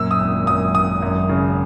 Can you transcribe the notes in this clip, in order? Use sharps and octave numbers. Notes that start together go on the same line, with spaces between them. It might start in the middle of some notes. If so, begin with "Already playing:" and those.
Already playing: F#2 A#2 E6
D#6
G#1
F#2 D#6
G#1 D#6
F#2
C#3